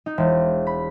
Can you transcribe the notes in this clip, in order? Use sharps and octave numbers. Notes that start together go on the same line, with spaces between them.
D#4
E1
B5